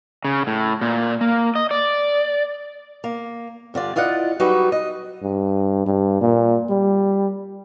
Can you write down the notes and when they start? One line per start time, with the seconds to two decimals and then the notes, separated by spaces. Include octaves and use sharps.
0.25 C#3
0.47 A2
0.81 A#2
1.21 A#3
1.55 D#5
1.71 D5
3.04 A#3
3.74 G2 D3 F4 D5
3.96 E4 F4 D5 D#5 F#5
4.40 F#3 G3 D#4 F#4 G4 B4
4.72 D#5
5.23 G2
5.86 G2
6.21 A#2
6.70 G3